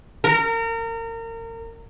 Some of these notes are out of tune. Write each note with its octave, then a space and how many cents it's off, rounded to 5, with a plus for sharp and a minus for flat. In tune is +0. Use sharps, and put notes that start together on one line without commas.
A#4 -30